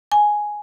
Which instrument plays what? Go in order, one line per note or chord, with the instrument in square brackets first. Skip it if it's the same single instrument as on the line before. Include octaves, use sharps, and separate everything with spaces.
[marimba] G#5